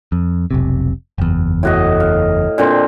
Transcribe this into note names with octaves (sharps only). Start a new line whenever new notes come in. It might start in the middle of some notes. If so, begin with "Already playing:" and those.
F2
F1 B1 C3
F#1 E2
A2 F#4 D#5
F5
A#2 D3 C4